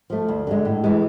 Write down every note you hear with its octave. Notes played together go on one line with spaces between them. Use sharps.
F3 A3
D2
D3 G#3
A2
E3 G#3